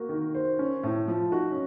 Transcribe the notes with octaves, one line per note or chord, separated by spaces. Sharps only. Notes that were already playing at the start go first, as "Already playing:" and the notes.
Already playing: A#3 F#4
D#3
C5
C#4
A2
F3
D#4 F#4
C#4